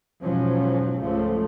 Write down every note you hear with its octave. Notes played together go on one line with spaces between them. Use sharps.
E2 G#2 B2 F3 F#3 C#4
C#2 G#2 C#3 F3 A3